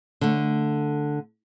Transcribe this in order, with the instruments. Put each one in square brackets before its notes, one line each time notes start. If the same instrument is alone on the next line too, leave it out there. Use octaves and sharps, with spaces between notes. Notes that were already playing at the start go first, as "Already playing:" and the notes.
[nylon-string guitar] D3 A3